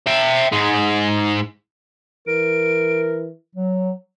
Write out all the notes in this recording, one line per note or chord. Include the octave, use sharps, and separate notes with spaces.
E5 G5
G#2 G#3
E3 A#4 D7
F#3